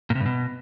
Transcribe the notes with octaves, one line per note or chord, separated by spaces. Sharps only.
A#2
C3
G2
B2